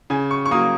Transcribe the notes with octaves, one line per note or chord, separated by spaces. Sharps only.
C#3 G#5
C#6
C#6
F#3 A#3 D#6